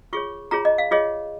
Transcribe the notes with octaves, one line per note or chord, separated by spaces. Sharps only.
F4 G#4 C#5 C#6
F4 G#4 C#5 A#5
D#5
F5
F4 G#4 C#5 D#5